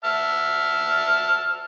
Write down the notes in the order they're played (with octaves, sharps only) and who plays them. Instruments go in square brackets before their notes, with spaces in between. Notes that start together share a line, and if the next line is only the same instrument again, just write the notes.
[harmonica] E5 A5 F6